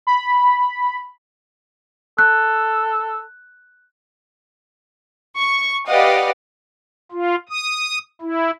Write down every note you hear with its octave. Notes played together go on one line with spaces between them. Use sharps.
B5
A4 F#6
C#6
G4 B4 D5 D#5 F5 F#5
F4
D#6
E4